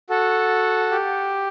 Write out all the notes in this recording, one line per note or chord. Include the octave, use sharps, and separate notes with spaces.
F#4 A4
G4